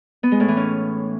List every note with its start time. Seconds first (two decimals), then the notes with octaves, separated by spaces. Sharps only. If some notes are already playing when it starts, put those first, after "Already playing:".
0.23 B3
0.32 G#3
0.40 A2
0.48 E3
0.57 C#4